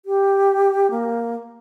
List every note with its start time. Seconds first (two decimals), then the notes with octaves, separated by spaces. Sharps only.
0.05 G4
0.90 A#3